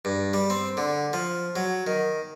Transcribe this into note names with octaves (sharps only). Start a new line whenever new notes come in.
G2
G3
C4
D3
F3
F#3
D#3